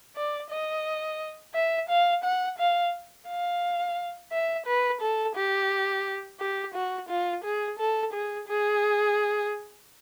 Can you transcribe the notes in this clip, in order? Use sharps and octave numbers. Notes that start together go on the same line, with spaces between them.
D5
D#5
E5
F5
F#5
F5
F5
E5
B4
A4
G4
G4
F#4
F4
G#4
A4
G#4
G#4